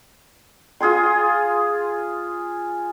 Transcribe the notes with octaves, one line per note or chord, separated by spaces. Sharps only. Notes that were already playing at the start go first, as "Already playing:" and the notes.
F4 G#4 G#5 C6